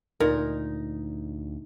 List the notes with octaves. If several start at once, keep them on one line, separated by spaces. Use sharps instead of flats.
D2 A#2 D#4 A#4